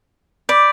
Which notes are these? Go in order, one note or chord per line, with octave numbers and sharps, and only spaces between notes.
D5 B5 D6 G6 B6 D7